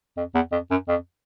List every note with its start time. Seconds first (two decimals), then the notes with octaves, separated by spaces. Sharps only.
0.17 F2
0.35 E2
0.52 F2
0.71 F#2
0.88 F2